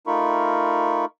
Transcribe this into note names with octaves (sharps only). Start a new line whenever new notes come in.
A3 D#4 F4 A#4 B5 C#6